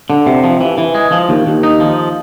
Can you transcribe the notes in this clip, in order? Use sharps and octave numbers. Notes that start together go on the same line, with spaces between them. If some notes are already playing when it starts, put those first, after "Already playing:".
D3
C3
F3
E3
E3
G#3
F3
D#2
D#2
D#4
F3